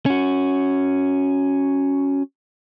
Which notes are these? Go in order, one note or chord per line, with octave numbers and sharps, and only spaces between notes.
C#4 F#4